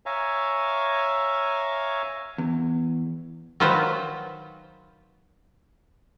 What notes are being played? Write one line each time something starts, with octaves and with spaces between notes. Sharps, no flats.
C#5 E5 F5 G#5 A#5
E2
D#3 F#3 F4 B4 C5